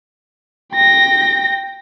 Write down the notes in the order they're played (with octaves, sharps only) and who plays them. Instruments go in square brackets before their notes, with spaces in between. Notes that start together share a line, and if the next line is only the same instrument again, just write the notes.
[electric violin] G5 A#6